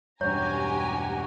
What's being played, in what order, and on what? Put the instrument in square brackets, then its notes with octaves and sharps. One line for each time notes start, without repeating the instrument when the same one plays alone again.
[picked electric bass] E1 G2 [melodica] F#4 [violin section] G4 G#5 A#5 [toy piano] C#5